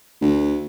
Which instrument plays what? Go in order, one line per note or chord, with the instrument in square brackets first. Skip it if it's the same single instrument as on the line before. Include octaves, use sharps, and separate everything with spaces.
[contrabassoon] D2